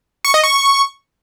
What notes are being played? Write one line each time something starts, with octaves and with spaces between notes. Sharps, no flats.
C#6
D#5
C#6